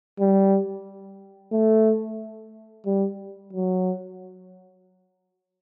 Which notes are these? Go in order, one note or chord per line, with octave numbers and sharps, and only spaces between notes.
G3
A3
G3
F#3